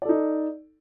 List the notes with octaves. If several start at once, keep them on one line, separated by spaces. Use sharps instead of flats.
D#4 A4 D5